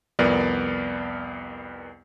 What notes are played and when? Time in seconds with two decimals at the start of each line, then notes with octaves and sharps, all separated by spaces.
0.19 C2 F2 B3 A#4 D5